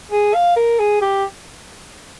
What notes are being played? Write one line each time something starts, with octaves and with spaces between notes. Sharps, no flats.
G#4
F5
A#4
G#4
G4